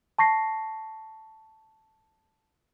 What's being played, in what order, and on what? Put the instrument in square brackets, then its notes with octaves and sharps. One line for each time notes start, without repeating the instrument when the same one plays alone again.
[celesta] A5 C#6 A#6 C7